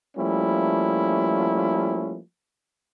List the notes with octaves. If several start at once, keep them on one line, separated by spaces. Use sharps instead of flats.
F3 G3 A3 A#3 C#4 E4